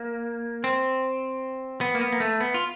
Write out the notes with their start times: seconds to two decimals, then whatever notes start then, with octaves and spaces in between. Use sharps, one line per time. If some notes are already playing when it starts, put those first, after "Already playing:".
Already playing: A#3
0.64 C4
1.81 B3
1.95 A#3
2.01 B3
2.12 A#3
2.20 A3
2.41 B3
2.54 F4